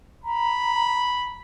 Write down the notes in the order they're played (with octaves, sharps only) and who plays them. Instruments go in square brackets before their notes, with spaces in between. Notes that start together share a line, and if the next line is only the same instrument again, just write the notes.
[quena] A#5 [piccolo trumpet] B5